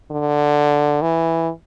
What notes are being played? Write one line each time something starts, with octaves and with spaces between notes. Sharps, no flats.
D3
E3